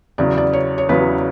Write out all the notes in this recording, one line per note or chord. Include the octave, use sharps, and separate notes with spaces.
E2 C#3 F#3 D5
D5
C#5
C#5
E2 C#3 F#3 B4